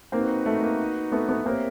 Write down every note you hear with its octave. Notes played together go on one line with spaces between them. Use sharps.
A#3 C4 D#4 F#4 B4
A3
A#3
A3 B3
A3 B3
A#3 C4 G4 A#4 C#5 E5